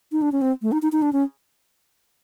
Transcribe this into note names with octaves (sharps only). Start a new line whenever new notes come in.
D#4
D4
C#4
C4
A3
D#4
D#4
D#4
D4
C#4